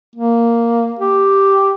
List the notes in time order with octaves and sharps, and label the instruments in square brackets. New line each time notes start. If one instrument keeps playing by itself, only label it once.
[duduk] A#3
G4